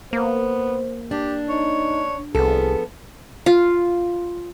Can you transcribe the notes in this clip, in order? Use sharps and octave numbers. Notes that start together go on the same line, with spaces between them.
A#3 B3 C5
D4 G4
D#4 C#5
C2 F3 B3 G#4 A4
F4